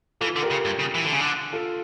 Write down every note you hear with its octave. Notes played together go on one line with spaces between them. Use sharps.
E3 F4 A4
D3
G4 A#4
C#3
G2
C#3
E3
D3
C#3
D3
F4 A4